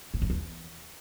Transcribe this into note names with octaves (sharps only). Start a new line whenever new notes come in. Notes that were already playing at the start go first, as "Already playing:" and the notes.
G#2
F2
E2